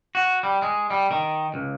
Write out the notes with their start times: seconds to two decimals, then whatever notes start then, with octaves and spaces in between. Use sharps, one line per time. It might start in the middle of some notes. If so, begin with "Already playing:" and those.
0.15 F#4
0.43 G3
0.62 G#3
0.90 G3
1.11 D#3
1.54 C#2